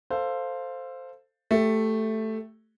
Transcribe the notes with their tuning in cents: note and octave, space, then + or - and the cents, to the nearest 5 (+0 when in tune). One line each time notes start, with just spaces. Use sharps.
A4 +15 C5 +0 F5 +0
A3 +0 G4 +0